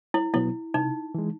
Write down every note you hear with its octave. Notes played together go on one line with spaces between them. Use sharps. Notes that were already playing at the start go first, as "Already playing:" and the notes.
E4
B2 F#3 B3 E4
C3 D#4
E3 G#3